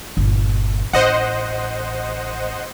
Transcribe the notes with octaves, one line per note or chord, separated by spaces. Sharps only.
G1 A#2
A1 C5 D#5 F#5